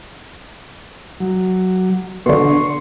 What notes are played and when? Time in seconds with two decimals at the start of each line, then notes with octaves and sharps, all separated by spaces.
1.20 F#3
2.26 B2 D3 C6 C#6